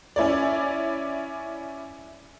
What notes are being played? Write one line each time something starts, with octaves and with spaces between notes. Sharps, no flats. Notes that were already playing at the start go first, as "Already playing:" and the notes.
C#4 E4 C#5 D5